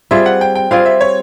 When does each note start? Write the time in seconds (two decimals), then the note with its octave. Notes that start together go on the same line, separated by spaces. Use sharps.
0.11 G3 C4 F4 G#4 E5
0.26 F#5
0.41 G5
0.55 G5
0.71 G3 C4 F4 G#4 F5
0.86 E5
1.01 C#5